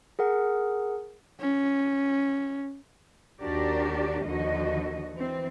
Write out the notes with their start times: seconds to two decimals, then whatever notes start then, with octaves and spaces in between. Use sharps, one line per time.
0.19 G#4 A#4 F#5
1.40 C#4
3.40 D#2 D4 F#4 G4 A#4 D5
4.24 D#2 D3 F3 F#4 D#5
5.13 E3 C4